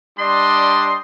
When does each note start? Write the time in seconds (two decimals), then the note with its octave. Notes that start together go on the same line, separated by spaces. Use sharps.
0.17 G3 D4 D#5 C6